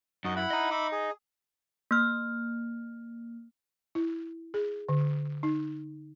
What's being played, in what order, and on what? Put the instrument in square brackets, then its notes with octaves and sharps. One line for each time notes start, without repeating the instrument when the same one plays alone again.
[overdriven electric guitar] F#2 [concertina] D#4 F#4 D#5
[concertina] E4 F#5 B5
[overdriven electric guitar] D#5 A#5
[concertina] E5 B5 D6
G#4
[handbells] A#3 F6
[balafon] E4
G#4
D3
D#4